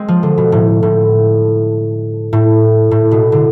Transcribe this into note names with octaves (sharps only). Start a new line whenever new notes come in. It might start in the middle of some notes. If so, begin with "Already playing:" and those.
Already playing: G#3 C4
F3
D3
B2
A2
A2
A2
A2
B2
D3